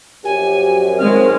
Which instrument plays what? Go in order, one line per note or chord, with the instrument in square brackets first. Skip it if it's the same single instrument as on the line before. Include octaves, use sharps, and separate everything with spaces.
[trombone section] A#1 F#2 [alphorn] G4 [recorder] G#5
[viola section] D#3 G#3 [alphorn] C4 [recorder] F6